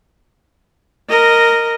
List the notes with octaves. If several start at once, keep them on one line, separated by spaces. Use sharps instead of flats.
A#4 D#5